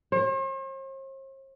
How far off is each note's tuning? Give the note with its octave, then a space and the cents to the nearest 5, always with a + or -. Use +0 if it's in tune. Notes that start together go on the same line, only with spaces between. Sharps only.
C5 +45